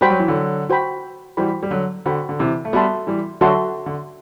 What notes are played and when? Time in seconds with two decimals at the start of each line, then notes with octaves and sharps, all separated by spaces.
0.01 G3 F#4 C5 G5 B5
0.10 F#3
0.20 E3
0.28 D3 F#3
0.70 F#4 C5 G5 B5
1.37 E3 G3 F#4 C5 G5 B5
1.63 G3
1.71 D3 F#3
2.06 D3 F#4 C5 G5 B5
2.29 D3
2.39 C3 E3
2.65 A3
2.73 G3 B3 F#4 A4 E5 A5 C6
3.07 E3 G3
3.41 D3 F#3 F#4 A4 E5 A5 C6
3.86 D3